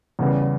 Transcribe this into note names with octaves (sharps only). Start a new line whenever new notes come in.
E2 C#3 G3 B3